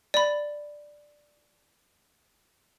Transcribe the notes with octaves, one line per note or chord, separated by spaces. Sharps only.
D5 B5